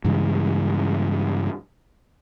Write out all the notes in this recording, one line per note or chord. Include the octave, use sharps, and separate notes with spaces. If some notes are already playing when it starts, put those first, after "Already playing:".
G2 C#3 E3 G#3